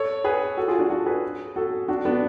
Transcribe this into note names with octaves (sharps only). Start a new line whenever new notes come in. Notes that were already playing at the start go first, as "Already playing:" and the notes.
Already playing: A4 C#5
G#4 B4
F#4 A4
F4 G#4
D4 F#4
D4 F#4
G#4 B4
F#4 A4
D4 F#4
B3 D4